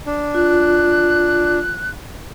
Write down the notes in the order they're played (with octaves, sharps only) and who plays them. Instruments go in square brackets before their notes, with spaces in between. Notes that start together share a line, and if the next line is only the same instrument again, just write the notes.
[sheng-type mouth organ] D4
[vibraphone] F4 [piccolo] F#6